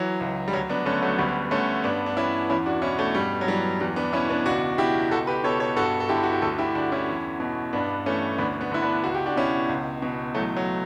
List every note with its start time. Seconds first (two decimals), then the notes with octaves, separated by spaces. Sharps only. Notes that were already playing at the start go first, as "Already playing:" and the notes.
Already playing: E3 F#3
0.20 C#2 F#3
0.48 G3
0.53 D2 F#3
0.69 B3 D4
0.86 D3 A3 C#4
1.02 F#3 A3
1.18 D2 G3 B3
1.51 D3 A3 C#4
1.84 G2 B3 D4
2.06 D4
2.17 E3 C#4 E4
2.50 E2 C#4 E4
2.66 D4 F#4
2.82 B2 C#4 E4
2.98 A3 C#4
3.15 G2 G3
3.41 F#3
3.47 E3 G3
3.80 E2 G3
3.96 B3 D4
4.13 B2 C#4 E4
4.30 B3 D4
4.45 C#2 D4 F#4
4.78 B2 E4 G4
5.11 C#2 F#4 A4
5.27 G4 B4
5.44 B2 A4 C#5
5.60 A4 C#5
5.76 G2 F#4 A4
6.00 A4
6.09 D3 E4 G4
6.23 F#4
6.33 G4
6.42 D2 F#4 A4
6.58 E4 G4
6.75 D3 D4 F#4
6.92 C#4 E4
7.08 E2
7.40 B2
7.73 G2 B3 D4
8.06 E3 A3 C#4
8.38 D2 B3 D4
8.61 B3 D4
8.72 D3 E4
8.82 B3 D4
9.04 C#2 F#4
9.14 G4
9.26 D4 F#4
9.36 B2 C#4 E4
9.69 C#2
10.02 B2
10.35 E3 F#3 A3
10.56 F#3